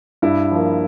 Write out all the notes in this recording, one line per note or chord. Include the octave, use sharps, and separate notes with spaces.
G2 E4
F3 A#3